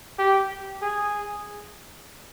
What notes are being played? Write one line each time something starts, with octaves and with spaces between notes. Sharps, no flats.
G4
G#4